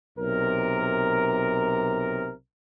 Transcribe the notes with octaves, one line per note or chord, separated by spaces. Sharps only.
B1 C3 A#4